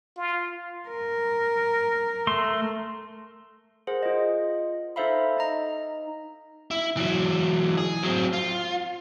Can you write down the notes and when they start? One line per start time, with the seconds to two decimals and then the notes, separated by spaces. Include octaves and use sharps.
0.17 F4
0.89 A#4
2.27 A3 C6
3.87 G#4 A#4 C5 F#5
4.03 F4 D#5
4.96 D#4 A4 C5 E5 F5 B5
5.37 D#4 D#5 A#5
6.71 E4
6.97 E3 F#3
7.78 G#4
8.03 F#3 C4
8.33 F4